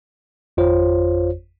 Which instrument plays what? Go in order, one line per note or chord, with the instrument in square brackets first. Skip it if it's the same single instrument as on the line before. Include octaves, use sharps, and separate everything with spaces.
[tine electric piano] G#1 F2 F4 C5 C#5